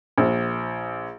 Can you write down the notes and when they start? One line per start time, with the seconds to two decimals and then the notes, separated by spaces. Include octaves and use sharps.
0.18 A#1